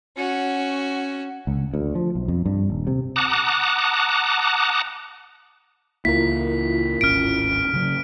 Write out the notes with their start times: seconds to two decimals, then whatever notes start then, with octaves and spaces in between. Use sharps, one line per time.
0.16 C#4 F#4
1.47 C#2
1.74 D2
1.95 F3
2.15 B1
2.28 F2
2.46 G2
2.70 D#1
2.87 C3
3.16 F#5 A5 A#5 D6 D#6 F#6
6.05 C#2 A#3 E4 F4 A#4 B6
7.01 D1 G#1 C#4 F6 D7
7.73 C#3 F#3 C#4